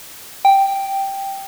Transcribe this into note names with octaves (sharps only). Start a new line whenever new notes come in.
G5